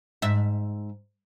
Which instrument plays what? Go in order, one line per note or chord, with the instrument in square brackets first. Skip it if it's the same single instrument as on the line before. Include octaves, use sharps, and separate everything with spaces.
[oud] G#2 E5